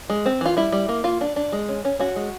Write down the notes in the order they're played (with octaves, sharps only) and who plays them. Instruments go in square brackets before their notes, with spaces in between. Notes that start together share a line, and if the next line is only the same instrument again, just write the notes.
[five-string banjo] G#3
C4
E3 F4
G3 E4
G3
A#3
A#3 F4
D4
D4
G#3
C#4
C#4
C#4 F#4
G#3